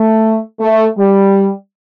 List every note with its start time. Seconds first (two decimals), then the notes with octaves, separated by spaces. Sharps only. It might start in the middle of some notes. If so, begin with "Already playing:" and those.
Already playing: A3
0.60 A3
0.97 G3